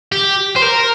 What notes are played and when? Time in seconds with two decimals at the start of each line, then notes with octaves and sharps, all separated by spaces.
0.12 G4
0.56 C5
0.62 A#4